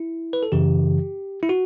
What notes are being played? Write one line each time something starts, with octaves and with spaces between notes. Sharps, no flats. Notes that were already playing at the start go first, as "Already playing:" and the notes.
Already playing: E4
B4
A4
F#2 C#3 E3 G4
E4
F#4